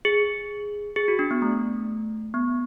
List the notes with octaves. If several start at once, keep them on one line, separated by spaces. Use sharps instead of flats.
G#4
G#4
F#4
D4
B3
A3
B3